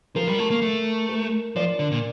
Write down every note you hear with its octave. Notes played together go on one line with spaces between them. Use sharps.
F3 A#4
G3
A3
A#3
A3
A#4
F3 D5
D3
A#2